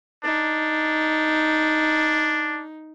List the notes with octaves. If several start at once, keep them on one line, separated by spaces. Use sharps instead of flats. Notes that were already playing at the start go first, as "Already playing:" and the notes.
D4 D#4